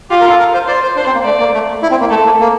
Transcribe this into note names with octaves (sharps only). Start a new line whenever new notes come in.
F4 G4
A#4
A4
A#4
C5
C5 D5
C5
D4 C5
C4
A#3
A3 D5
A#3
A3
E4
C4
A#3
A3 A4
A#3
A#3